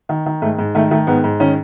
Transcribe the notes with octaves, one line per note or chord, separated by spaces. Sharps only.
D#3
D#3
G#2 A3
G#2
D#3 A3
D#3 A3
G#2 B3
G#2
D#3 C#4